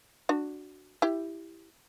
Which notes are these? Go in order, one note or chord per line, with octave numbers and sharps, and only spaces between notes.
D4 F#4
E4 G4